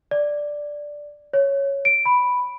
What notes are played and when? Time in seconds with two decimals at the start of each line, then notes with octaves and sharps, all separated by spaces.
0.11 D5
1.33 C#5
1.85 D7
2.06 B5